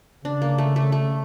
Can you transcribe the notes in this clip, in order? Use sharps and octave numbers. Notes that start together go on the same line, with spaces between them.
C#3 D4
A#3
A3
A3
A3